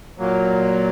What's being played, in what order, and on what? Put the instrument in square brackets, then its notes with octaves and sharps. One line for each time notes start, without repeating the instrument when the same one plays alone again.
[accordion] A#2 F#3 A#3